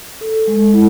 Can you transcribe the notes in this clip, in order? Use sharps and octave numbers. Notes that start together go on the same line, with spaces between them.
A4
G#3
E4